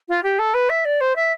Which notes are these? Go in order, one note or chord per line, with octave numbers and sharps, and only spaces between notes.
F4
G4
A4
B4
E5
D5
C5
E5